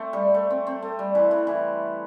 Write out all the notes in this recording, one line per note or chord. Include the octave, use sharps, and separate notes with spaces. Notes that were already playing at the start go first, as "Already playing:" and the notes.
Already playing: A3 C4
G3
A3
C4
C4
A3
G3
E3
E3
E3